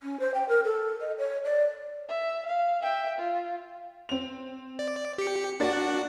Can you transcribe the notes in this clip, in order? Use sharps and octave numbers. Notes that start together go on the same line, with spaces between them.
C#4
C5
G5
A#4
A4
D#5
C#5
D5
E5
F5
E5 G5
F4
C4 F7
D5
G4 C#7
A#3 D4 F#4 D5 F#5 A6